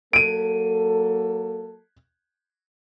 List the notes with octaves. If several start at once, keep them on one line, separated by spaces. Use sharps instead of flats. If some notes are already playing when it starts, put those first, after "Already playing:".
F#3 A#3 A4 D7 D#7